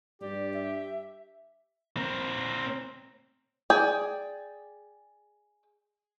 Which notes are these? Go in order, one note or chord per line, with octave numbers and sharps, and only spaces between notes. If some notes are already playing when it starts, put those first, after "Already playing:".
G2 G4 D5
E5
C4 A#4
G#4 D5 G5